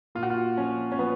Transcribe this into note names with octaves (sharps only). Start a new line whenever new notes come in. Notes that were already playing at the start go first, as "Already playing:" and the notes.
A#2 F4
F#4
F4
F3 C#4
C#4
F3 B3